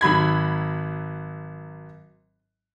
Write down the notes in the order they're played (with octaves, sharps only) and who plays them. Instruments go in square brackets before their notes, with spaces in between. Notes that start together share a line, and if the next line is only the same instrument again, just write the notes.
[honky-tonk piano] G#1 F#3 B5 G#6